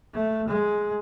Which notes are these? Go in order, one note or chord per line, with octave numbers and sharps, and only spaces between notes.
A3
G#3